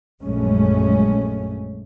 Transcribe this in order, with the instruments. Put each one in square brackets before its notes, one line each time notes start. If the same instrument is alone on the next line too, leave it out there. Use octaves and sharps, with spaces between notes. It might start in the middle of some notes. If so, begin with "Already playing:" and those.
[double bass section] A#1 F#2 G#3 A3 C#4